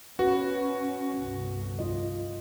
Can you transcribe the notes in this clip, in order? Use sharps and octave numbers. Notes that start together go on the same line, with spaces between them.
C#4 F#4 B4
G1 C2
F4 D#5